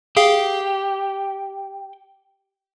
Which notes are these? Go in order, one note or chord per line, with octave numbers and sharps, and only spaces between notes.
G4 G#4 F5